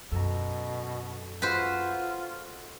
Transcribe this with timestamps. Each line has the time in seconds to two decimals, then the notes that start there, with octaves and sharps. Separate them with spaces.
0.12 F#2 B2 A4 A#5
1.42 G#3 F4 F#4 A4 B4 C5